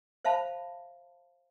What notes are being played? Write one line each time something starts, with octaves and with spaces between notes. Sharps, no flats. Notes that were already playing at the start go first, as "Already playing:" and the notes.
C5 E5 F5 A5 B5